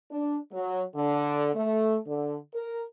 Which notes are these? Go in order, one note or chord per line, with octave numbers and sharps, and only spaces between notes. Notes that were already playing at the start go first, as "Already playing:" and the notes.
D4
F#3
D3
A3
D3
A#4